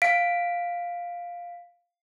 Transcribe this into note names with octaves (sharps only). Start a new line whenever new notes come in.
F5 B6 D7